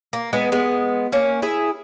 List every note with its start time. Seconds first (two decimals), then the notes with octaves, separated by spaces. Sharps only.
0.13 A#3
0.33 G#3 B3
0.52 G#3 B3
1.12 A#3 C#4
1.42 E4 G#4